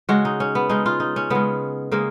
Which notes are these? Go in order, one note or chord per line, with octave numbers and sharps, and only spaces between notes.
C#3 G#3 F#4
D#4
C#4
B3
C#3 G#3 D#4
F4
D#4
C#4
C#3 G#3 B3
C#3 G#3 A#3